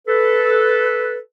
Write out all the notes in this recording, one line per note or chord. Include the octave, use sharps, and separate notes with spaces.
A4 B4